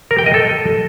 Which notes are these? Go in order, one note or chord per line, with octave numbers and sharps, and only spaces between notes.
A#4
G5
D#5
A4